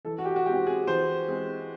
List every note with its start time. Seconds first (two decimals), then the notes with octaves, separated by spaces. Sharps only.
0.05 E3 A4
0.18 F#4
0.25 G4
0.36 F#4
0.46 G#3 C4 G4
0.66 G#4
0.87 E3 C5
1.28 G#3 C4